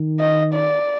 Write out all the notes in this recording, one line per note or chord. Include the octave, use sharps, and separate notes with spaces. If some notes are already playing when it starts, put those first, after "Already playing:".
Already playing: D#3
D#5
D5